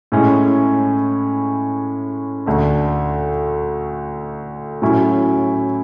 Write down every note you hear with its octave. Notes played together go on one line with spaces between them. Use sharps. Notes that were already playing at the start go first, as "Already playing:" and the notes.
A2 G#3 C#4 E4
D2 D3 A3 D4
A2 F#3 C#4 E4